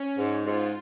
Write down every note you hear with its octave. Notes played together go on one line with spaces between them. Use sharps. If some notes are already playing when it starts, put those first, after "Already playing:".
Already playing: C#4
G#2
G#2 F4